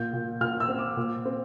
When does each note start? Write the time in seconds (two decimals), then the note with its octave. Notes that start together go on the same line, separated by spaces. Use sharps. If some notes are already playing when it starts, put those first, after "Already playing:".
Already playing: A#2 G6
0.13 A#2
0.41 A#2 F6
0.60 E6
0.68 C4
0.79 D6
0.97 A#2
1.26 C4